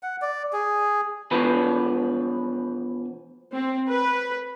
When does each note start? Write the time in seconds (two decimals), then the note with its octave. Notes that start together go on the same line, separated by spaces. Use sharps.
0.03 F#5
0.22 D5
0.53 G#4
1.31 B2 E3 F3 B4
3.52 C4
3.90 B4